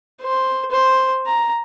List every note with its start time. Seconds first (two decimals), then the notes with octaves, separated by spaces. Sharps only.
0.22 C5
0.71 C5
1.27 A#5